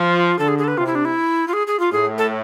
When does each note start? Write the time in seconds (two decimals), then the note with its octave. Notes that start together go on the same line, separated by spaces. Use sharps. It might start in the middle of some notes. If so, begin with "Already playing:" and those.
Already playing: F3 F4
0.39 D3 A4
0.48 G#4
0.58 G#4
0.64 A4
0.68 B4
0.78 C3 F4
0.87 E4
0.95 D4
1.05 E4
1.48 F4
1.53 G#4
1.67 G#4
1.79 F4
1.92 A2 G#4
2.18 A4